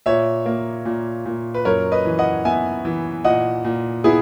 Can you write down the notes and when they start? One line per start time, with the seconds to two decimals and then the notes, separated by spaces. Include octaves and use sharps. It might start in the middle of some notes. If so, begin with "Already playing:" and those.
0.06 A#2 C#5 E5
0.46 A#3
0.85 A#2
1.26 A#2
1.54 B4
1.65 F#2 A#4 C#5
1.92 B4 D#5
2.05 E3
2.19 D#5 F#5
2.45 B3 E5 G#5
2.85 E3
3.25 A#2 D#5 F#5
3.64 A#2
4.04 B3 E4 G#4